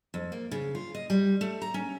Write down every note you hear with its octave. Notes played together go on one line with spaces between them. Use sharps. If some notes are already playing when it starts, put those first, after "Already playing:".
F2
A#3
C#3
F4
D#5
G3
A3
A#5
C#4